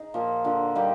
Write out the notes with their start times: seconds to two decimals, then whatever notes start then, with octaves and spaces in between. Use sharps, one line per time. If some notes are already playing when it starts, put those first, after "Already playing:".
Already playing: D#4 G#4
0.14 A#2 F3 A#3
0.44 D3 F3 A#3
0.75 G3 A#3 D#4 G4